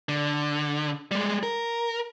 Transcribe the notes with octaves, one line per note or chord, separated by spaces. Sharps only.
D3
G3 G#3
A#4